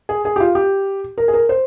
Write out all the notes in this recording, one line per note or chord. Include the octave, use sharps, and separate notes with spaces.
G#4
G#4
G4
F4
G4
A#4
G#4
A#4
C5